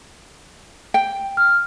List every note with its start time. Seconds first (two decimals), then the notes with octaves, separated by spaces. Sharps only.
0.94 G5
1.37 F6